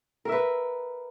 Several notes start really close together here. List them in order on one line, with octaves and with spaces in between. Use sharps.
A#4 E5 B4